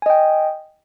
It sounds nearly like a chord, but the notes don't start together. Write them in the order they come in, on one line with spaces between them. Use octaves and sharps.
G#5 D#5 G5